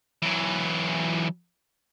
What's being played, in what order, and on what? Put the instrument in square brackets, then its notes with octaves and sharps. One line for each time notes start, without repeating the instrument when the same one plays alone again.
[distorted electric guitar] E3 F#3